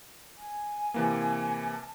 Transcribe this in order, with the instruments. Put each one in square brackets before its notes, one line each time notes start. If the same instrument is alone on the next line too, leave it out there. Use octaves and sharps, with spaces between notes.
[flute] G#5
[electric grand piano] C3 E3 A#3
[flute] A5